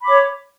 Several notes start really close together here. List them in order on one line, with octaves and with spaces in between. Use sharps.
B5 D6 C#5